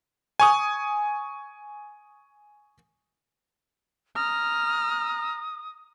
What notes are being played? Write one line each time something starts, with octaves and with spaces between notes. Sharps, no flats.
G#5 C#6 D#6
A#5 D#6 F6